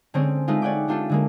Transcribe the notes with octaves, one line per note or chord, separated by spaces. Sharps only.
D3 G#3 C4 C#4 G#4 C#5
G#3 A3 D#4 F4
C#5 D5 F#5 G5 D6
A3 D4 F4 G4 A4
D3 G#3 A#3